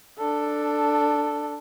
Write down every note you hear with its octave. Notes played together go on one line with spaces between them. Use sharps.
D4 A4